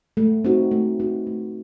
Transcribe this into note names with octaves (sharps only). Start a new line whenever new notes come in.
A3
C4 D#4 F#4 B4
A3
C4 D#4 F#4 B4
A3